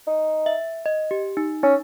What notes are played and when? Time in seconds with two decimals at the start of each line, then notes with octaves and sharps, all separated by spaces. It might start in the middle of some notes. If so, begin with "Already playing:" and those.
0.07 D#4
0.46 E5
0.86 D#5
1.11 G4
1.37 D#4
1.63 C#4 D#4